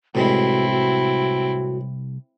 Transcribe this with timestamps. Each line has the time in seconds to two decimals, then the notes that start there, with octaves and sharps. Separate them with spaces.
0.15 C2 A2 E3 G#3 C4 E4 F#4
0.72 F#4